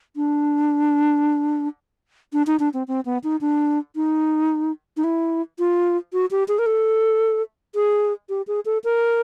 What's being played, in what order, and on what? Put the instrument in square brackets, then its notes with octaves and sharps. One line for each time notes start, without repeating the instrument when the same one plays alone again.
[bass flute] D4
D4
D#4
D4
C4
C4
B3
D#4
D4
D#4
D#4
E4
F4
F#4
G4
G#4
A#4
A4
G#4
G4
G#4
A4
A#4